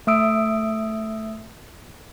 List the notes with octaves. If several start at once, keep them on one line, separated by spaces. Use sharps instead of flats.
A3 E5 D#6 E6 D7